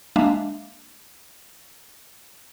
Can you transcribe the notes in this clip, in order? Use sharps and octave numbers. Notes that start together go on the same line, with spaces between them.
G#3 A#3 D4 E5 F5